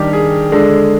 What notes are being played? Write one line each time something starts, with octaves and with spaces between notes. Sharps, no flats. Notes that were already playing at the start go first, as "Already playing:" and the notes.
Already playing: D#3 G3 D4 G4
G#4
D3 G#3 D4